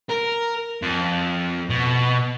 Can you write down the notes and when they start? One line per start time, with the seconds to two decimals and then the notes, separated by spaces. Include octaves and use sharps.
0.10 A#4
0.82 F2
1.70 B2